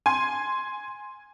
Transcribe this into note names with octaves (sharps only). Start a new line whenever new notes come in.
G#5 C6